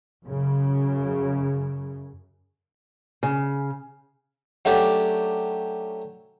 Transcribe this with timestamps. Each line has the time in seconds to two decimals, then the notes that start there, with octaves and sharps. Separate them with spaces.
0.24 F#2 C#3
3.23 C#3
4.65 F#3 A3 C#4 D4 G4